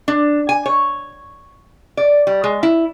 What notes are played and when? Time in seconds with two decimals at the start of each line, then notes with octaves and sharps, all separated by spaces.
0.08 D4
0.49 G#5
0.66 C#5
1.97 D5
2.27 G3
2.44 G#3
2.63 E4